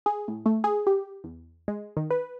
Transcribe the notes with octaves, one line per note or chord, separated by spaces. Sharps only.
G#4
A2
A3
G#4
G4
E2
G#3
D#3
B4